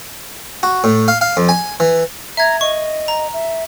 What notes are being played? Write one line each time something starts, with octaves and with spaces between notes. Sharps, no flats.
F#4
A2
F5
F5
F2
G#5
E3
E5 A#5 G#6
D#5 C#6
A#5
E5